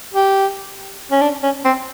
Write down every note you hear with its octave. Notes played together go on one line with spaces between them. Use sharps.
G4
C#4
D4
C#4
C4